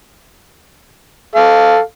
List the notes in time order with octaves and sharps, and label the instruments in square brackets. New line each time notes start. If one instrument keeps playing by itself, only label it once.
[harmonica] A4 F5